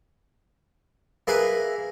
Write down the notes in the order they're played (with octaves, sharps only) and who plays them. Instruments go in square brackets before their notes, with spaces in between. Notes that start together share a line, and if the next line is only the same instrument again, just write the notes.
[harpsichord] A#3 E4 G#4 B4